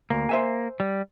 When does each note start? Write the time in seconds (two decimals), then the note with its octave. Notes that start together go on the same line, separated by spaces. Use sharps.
0.10 D2 A#3
0.29 C5 E5 G#5
0.80 G3